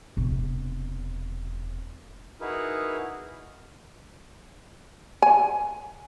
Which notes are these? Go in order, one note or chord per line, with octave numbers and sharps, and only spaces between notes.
E1 C3
D#4 E4 F#4 G#4 A#4 B4
G#5